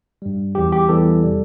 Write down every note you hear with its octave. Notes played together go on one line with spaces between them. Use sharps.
G2 G3
E2 E3 G3 G4
G4
E2 E3 G3 A4
C3 G3